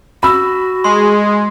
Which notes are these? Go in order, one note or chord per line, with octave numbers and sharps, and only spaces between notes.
F#4 B5 E6
G#3 C6